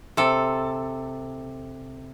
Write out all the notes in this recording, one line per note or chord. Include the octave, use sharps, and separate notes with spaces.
C3 A4